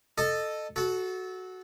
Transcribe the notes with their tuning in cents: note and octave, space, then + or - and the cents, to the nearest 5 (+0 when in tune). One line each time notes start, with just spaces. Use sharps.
A4 +0 D#5 -20
F#4 +0 A4 -25